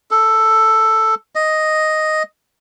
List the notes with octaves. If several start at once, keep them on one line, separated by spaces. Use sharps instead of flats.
A4
D#5